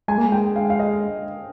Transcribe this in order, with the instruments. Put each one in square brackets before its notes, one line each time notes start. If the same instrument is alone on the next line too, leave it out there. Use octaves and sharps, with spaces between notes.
[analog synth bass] G#3 [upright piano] G#5
[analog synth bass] A#3
G#3
[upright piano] G5
F5
F5
D#5